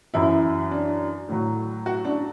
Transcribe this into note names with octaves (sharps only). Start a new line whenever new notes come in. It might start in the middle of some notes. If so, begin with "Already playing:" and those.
F#2 E3 E4
D4
A2 F#3
F#4
D4